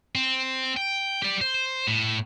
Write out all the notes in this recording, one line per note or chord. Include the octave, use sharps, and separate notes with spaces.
C4
G5
G4 D5
C5
A2